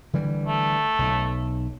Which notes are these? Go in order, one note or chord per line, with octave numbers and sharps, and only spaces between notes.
D3 E3 G3
A3
B1